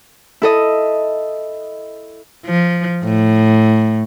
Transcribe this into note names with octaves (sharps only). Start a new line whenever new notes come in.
E4 A4 D#5
F3
A2